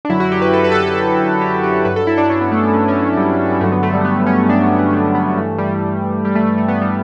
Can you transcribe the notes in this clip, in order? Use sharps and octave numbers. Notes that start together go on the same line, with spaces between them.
D4
F#2 D3 F#3 E4
F#4
G4
B4
A4
B4
A4
B4
A4
G4
G4
G2 F#3 B4
A4
E4
D4
C#4
B3
A3
B3
C#4
C#4
A3
G3
G3
G2 D3 F#3 A3
B3
A3
G3
B3
C#4
D4
B3
B3
A3
B3
G2 E3 A3
G3
G3
A3
A3
A3
B3
G3